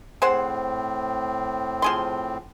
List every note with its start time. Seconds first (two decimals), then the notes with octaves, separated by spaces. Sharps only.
0.22 A2 C4 G#4 C5 F#5
1.82 F3 G#4 C6